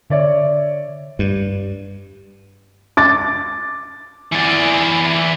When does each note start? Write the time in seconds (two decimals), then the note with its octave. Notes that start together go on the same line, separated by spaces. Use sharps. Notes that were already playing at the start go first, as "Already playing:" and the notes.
0.10 D3 C#5 D5 E5
1.19 G2
2.97 D6 A6
4.32 E3 D5